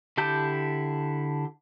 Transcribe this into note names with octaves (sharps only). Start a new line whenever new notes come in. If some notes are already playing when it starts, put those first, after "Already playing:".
D3 E4 G4 A5 G6